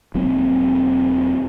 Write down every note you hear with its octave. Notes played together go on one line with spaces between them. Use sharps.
E1 F#3 A#3 C4